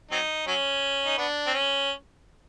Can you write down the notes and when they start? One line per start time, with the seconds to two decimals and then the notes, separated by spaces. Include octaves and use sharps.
0.11 F#3 C4 D#4
0.47 F#3 C#4
1.06 D#4
1.18 B3 D4
1.47 C4
1.54 C#4